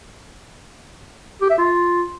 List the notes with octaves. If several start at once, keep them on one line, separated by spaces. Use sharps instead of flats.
G4
E5
F4